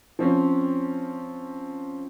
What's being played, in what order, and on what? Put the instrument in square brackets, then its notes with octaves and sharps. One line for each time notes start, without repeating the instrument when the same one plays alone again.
[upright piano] F3 C4 C#4